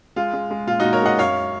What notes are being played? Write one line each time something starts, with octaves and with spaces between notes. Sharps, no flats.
G#3 F4
G#3
G#3
A#2 F4
D#4 F#4
A#2
A#4 C#5
G#3 D#5 F#5
F#2 C#5 F5